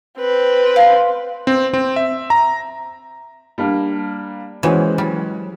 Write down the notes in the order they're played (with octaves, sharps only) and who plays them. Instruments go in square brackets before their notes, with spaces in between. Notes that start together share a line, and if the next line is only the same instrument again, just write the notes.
[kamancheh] C4 B4
[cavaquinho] F5 C6
[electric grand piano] C4
C4
E5
A#5
[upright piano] G3 A#3 D4
[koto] E3 [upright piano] G#3 C#4 F#4 [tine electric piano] B4 C5 G#5
[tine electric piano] F#3 [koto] G3